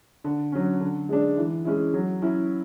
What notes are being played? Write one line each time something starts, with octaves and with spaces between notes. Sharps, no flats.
D3
F#3 C#4
D3
G#3 D4
E3
G#3 C#4 E4
F#3
C#4 E4